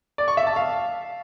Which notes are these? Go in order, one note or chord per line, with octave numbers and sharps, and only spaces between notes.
D5
C#6
E5
A5
F5